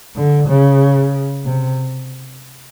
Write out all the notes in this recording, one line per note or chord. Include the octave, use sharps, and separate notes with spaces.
D3
C#3
C3